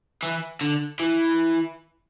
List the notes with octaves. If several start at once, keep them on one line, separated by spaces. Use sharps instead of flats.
E3
D3
E3